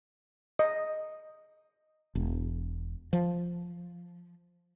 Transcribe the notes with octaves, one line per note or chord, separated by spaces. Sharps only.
D#5
E1
F3